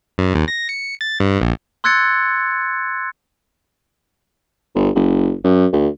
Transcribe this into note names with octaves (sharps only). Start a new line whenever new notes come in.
F#2
D#2
A#6
C#7
A6
G2
A#1
C6 E6 F#6 G#6 A6 C#7
G1
F#1
F#2
D2